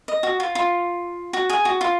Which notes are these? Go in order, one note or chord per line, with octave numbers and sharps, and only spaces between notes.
D#5
F#4
F4
F4
F#4
G#4
F#4
F4